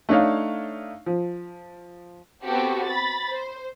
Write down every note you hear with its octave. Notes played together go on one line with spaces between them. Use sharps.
A3 D4 D#4 C#5 F5
F3
B3 C4 F#4 G4 A4
B5 A6
C5